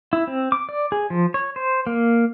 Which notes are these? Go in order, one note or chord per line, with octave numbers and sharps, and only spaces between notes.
E4
C4
D6
D5
G#4
F3
C#5
C5
A#3